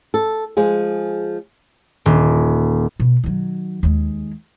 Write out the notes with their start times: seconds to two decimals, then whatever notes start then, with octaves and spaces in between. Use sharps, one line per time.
0.14 A4
0.57 F3 G#3 G#4
2.06 D#1
3.00 B2
3.24 D#3 F#3
3.83 D#2 G#3